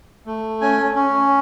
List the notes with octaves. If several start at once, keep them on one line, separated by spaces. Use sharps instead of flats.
A3
C#4 G#5
C#4